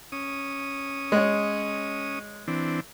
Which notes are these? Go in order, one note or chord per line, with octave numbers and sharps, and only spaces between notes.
C#4 D#6
G#3 C#5
E3 C4 D4